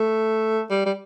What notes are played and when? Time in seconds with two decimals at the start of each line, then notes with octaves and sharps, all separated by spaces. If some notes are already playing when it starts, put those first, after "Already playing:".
Already playing: A3
0.70 G3
0.86 G3